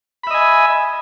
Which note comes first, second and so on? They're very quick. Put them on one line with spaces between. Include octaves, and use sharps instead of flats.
B5 E5 D#5 G#5